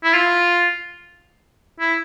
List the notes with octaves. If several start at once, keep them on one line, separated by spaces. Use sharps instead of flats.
E4
F4
E4